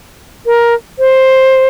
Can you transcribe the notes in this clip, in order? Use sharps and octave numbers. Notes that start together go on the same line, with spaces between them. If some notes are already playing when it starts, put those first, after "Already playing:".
A#4
C5